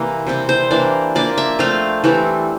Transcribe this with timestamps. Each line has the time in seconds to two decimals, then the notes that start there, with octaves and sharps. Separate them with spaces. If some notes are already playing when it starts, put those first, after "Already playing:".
Already playing: C3 E3 G3 A#3
0.27 C3 G3 C4
0.49 C5
0.71 E3 A#3 D4 D5
1.15 F3 A#3 D4 D5
1.38 E5
1.59 F3 A3 C4 F5
2.04 E3 G3 C4